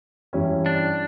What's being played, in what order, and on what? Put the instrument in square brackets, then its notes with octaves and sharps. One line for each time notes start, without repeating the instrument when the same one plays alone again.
[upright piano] G2 E3 G3 C#4 E4
[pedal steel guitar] D4